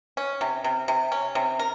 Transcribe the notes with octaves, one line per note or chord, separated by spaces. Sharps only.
C#4
C3
C3
C3
C#4
C3
A#4